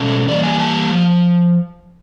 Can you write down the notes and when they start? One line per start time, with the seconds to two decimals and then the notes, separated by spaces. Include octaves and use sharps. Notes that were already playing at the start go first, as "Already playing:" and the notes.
Already playing: B2 G#3 C#4 A4
0.28 E3 G3 A#3 D5
0.44 G#5
0.59 A5
0.91 F3